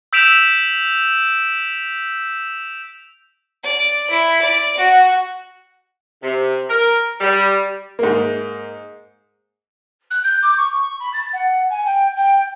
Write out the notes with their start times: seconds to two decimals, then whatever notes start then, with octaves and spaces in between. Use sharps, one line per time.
0.13 E6 G6 B6 D7 E7 F7
3.64 D5
4.10 E4
4.41 D5
4.77 F#4
6.23 C3
6.69 A#4
7.21 G3
7.99 G#2 A#3
10.11 F#6
10.24 G6
10.43 D6
10.57 C#6
11.00 B5
11.14 A6
11.33 F#5
11.70 G#5
11.86 G5
12.16 G5